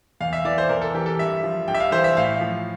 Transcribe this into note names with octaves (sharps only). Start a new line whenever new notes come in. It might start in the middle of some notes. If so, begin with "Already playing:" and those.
E2 F5
E5
E3 D5
C5
E2 A#4
A4
E3 G4
A4
G2 E5
F3
G2 G5
E5
F5
E3 C5
E5
A2 F5
F3